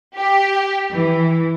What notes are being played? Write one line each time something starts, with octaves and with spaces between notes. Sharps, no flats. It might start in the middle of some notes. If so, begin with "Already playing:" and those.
G4
E3